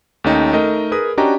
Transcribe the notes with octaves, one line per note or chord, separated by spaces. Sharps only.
D#2 A3 C#4 D#4 G5
A3 D#4 A#4 D#5
G#4 A#4 B4 D#6
C#4 D4 F#4 G4 D#5 A#5